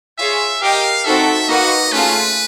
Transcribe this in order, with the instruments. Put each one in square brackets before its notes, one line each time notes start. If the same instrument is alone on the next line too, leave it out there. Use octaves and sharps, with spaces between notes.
[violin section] F4 G#4 C#5 F5 G#5 [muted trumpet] E5
[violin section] G4 A#4 D#5 G5 [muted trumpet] F5
[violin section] C4 D#4 F#4 A4 [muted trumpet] E5
[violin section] A#3 D#4 F#4 B4 [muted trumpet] D#5
[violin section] A3 C#4 F4 G#4 [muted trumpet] B4